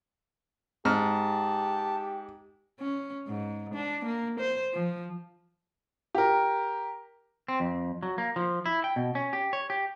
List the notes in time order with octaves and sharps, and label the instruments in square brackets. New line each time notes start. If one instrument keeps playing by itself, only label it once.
[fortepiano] G#2 F6 [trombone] G4 [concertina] A5
[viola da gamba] C#4
G#2
D4
A#3
C5
F3
[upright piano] G4 A#4
[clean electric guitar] C4
F2
F#3
A#3
F3
E4
G5
B2
C#4
G4
C#5
G4